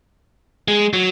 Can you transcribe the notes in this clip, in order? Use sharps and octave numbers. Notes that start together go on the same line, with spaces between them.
G#3
F#3